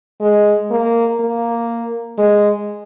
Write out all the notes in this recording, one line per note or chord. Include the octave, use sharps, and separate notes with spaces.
G#3
A#3
A#3
G#3